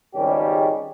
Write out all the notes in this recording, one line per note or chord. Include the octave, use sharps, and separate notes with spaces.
G#1 C#2 D#3 G3 C#4 G4